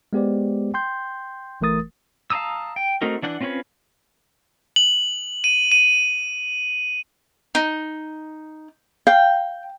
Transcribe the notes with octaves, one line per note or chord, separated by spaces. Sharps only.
G#3 B3 G4 C5 D5
G5 C6 G6
G1 E3 A3 A#4 D#6 A6
F5 A5 A#5 D#6 E6
G5
A3 C4 D#4 F#4 A#4
E3 D4 F#5 F#6
C4 C#4 F4 B4 C#5
F#7
D#7
D#7
D#4
F5 G5